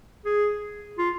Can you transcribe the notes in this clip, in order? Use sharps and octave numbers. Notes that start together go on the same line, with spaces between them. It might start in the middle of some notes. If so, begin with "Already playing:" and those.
G#4
F4